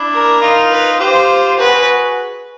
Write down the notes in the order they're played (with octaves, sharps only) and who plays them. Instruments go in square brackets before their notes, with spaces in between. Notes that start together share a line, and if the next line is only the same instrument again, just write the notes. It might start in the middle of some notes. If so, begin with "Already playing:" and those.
Already playing: [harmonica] D4 E4
[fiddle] A#4
[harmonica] D#4 F4
[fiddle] B4
[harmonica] F4 G4 [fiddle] C5
[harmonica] F#4 G#4 [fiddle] B4